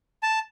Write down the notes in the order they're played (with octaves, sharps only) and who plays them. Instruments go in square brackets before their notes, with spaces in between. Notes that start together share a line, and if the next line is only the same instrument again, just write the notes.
[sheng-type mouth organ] A5